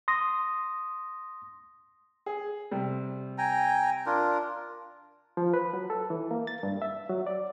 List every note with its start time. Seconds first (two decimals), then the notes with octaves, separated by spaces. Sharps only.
0.08 C6 D#6 A#6
2.26 G#4
2.71 C3 G3
3.38 G5 G#5 A#5
4.06 D4 F4 A#4
5.37 F3
5.54 B4
5.73 F#3
5.90 A4
6.10 E3
6.31 A#3
6.47 A6
6.63 G2
6.82 E5
7.10 F#3
7.27 D5